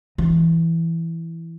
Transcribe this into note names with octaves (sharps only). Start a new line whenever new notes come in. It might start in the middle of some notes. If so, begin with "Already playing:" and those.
E3